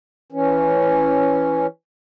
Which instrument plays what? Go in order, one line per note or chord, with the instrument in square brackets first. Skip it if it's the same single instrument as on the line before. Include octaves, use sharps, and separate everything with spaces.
[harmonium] E3 C#4